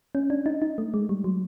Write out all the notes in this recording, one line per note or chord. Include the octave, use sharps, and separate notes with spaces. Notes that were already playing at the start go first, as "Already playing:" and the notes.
C#4
D4
D#4
D#4
A3
G#3
G3
F#3